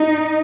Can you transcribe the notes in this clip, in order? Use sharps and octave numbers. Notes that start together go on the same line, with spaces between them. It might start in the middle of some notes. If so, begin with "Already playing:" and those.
Already playing: D#4